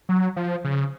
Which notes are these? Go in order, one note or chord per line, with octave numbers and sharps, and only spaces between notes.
F#3
F3
C#3